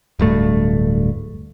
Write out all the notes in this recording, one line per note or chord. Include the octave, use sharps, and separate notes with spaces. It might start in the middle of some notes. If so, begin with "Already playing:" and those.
D1 G2 A3